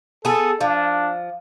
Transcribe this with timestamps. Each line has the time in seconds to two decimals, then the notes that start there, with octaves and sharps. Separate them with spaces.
0.25 B3 G#4 A4
0.61 F3 D4